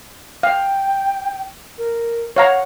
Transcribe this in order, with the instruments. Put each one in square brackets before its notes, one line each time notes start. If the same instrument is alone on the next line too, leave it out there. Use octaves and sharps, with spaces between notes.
[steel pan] F5 [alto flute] G5
[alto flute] A#4
[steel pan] C#5 F5 A#5 [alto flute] F#5